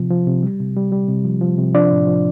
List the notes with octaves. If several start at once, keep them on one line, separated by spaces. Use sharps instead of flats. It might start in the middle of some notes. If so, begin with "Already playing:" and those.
Already playing: C3 F3
F3
C3
G3
C3
G3
G3
C3
F3
F3
C3
F3 D4 D5
A2
F3